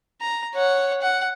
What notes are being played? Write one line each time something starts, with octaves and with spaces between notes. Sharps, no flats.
A#5
C#5 F#5
F#5